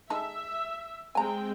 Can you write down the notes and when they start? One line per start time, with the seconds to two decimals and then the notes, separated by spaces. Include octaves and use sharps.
0.10 G#3 D#4 A4 E5
1.15 G#3 C4 G5 G#5 A#5